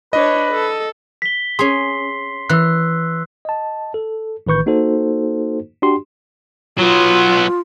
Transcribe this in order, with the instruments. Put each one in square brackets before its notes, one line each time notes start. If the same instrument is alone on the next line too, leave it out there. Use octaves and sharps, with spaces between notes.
[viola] D4 C#5 [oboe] B4 [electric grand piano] D#5
[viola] A4
[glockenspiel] B6 G7
[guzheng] C#4 G#4 [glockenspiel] C6 C7
[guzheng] E3 [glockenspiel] E6 F#6
[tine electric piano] D#5 A5
A4
A1 D#3 B4 C#6 G6
A#3 D#4 F#4 A4 C5
D4 F#4 G4 C6
[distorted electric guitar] F#3 B3 [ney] F4